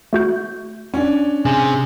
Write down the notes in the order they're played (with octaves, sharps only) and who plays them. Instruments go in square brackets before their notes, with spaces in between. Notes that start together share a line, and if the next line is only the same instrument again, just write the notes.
[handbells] A3 F#4 G6
[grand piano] C#4 D4
[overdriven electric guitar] C3 [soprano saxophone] G#4